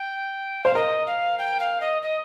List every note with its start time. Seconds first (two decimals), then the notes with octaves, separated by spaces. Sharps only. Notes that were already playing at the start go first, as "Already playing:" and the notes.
Already playing: G5
0.64 C5 F5
0.75 A#4 D#5
1.06 F5
1.39 G5
1.60 F5
1.81 D#5
2.02 D#5